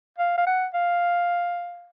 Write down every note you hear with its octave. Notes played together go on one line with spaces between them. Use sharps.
F5
F5
F#5
F5